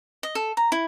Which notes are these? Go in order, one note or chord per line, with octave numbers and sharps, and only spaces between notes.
D#5
A4
A#5
E4